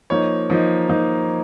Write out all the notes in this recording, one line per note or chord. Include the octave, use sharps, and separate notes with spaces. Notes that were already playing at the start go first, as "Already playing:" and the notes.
F3 A#3 D#4 C#5
F3 A#3 D#4
F3 A#3 D#4